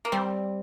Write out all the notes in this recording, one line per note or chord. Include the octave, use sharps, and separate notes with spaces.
A#3
G3 C4